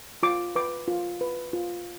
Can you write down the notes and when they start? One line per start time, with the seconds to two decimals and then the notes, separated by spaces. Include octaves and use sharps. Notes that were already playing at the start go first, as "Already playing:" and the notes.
0.23 F4 D6
0.56 B4 D6
0.88 F4
1.21 B4
1.53 F4